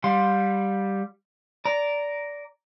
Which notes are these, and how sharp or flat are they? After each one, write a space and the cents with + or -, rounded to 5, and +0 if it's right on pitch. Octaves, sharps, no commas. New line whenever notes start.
G3 +0 F5 +35 C6 +0
D5 -15 A#5 +0